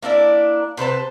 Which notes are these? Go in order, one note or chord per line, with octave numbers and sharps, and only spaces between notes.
A#3 D4 E4 D5
C3 B4 C5 A5